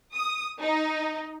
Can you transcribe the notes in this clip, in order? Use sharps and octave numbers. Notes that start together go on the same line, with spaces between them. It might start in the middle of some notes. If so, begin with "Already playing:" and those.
D#6
D#4